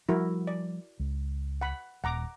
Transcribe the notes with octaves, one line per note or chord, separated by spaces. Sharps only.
F3 G3 E4 F#4 A#4
D5
C#2
F#5 B5
D#1 F#5 A#5 D6